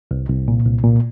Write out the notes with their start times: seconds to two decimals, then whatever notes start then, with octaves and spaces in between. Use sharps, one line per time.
0.11 C2
0.29 C2
0.48 A#2
0.65 C2
0.84 A#2